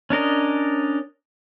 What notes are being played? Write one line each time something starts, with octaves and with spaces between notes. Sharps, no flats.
C#4 D4 A#4 D#5